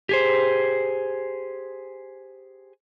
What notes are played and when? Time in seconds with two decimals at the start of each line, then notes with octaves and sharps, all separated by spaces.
0.09 G4 G#4 C5